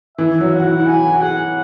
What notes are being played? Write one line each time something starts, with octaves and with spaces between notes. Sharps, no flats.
E3 E5
F#3
F#5
F#4
E4
E4
F#4 G#5
F#4
G#4 F#5